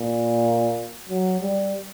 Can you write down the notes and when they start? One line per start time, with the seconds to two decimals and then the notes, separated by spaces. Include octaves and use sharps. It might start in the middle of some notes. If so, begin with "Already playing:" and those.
Already playing: A#2
1.09 F#3
1.41 G3